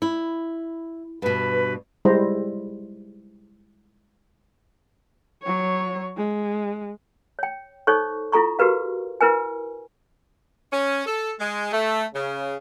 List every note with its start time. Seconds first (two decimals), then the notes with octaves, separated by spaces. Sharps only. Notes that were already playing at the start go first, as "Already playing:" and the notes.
0.02 E4
1.22 G2 B2 B4
2.05 G3 G#3 E4 C5 A#5
5.43 F#3 C#5
6.17 G#3
7.39 C#5 G5
7.87 D#4 A4 C5 C#5 C#6
8.32 E4 F4 A4 A#5 C#6
8.59 F#4 G4 A#4 B4 F5
9.21 E4 A#4 B4 G#5
10.72 C#4
11.06 A4
11.39 G#3
11.72 A3
12.13 C#3